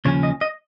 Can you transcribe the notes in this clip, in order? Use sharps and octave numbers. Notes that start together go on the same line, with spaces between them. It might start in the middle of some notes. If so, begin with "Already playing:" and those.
D#2 C#3 F3 C#4 C#5
D#5
D#5